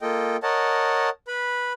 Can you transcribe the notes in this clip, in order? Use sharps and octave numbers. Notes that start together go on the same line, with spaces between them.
A#3 F4 A4 D#5 G5
A#4 C#5 D#5 F#5 A5
B4 B5